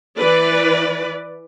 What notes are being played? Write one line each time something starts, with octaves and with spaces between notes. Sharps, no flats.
E3 B4 D5